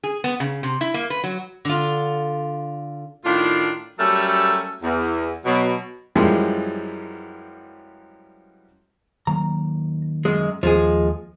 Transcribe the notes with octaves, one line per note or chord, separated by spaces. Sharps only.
G#4
B3
C#3
C3
E4
A#3
B4
F#3
D3 F4
A2 D#3 D4 F4
F#3 G3 A3 C#4 A4 A#4
E2
B2 F#3
F#2 E3 F3 G3 G#3
D#3 F#3 A#3 A#5
F#2 G#3
D#2 F3 G#3 G#4